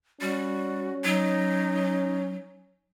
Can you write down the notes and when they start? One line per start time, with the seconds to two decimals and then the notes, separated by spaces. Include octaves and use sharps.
0.21 G3 C#4 F#4
1.04 F#3 D#4